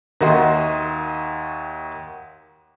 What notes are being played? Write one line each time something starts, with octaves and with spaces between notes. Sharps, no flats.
D#2 D#3 F#4 D#5 E5 C6